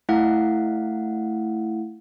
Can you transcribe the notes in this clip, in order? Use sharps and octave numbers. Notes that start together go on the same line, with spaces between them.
A3 E4 F5 F#5